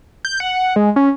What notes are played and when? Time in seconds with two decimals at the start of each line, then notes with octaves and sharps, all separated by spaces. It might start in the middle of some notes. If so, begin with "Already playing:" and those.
0.25 G6
0.40 F#5
0.76 G#3
0.96 C#4